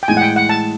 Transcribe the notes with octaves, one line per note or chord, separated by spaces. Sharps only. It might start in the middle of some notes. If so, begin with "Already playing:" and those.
G5
A2 E3 G#3 G#5
F#5
G5
F#5
A5